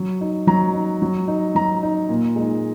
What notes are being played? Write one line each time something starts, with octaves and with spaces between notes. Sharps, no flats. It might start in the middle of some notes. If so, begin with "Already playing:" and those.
Already playing: F#3
D#4
F#3 A#5
D#4
F#3
D#4
F#3 A#5
D#4
A#2
G#3 D#4